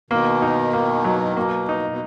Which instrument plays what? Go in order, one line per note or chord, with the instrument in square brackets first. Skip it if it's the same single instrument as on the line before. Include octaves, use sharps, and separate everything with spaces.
[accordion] B2 D#3 [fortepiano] A#3
[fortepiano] D#4
A#3
F#3
[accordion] B2 [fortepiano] A#3
[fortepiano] D#4
[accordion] B2